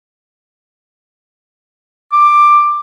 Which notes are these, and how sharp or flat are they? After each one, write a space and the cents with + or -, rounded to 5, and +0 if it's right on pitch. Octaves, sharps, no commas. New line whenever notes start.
D6 +10